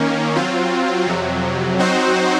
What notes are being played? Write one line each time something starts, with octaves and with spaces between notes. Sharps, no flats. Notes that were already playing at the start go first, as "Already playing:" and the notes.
Already playing: D#3 A#3 C#4
F#3 C4 F4
F2 C3 F#3
F#3 C4 D#4 F#4 C5